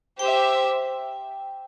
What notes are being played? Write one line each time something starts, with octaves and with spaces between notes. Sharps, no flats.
G4 C5 E5 G5